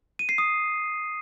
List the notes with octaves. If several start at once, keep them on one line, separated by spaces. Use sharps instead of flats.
D#7
C7
D#6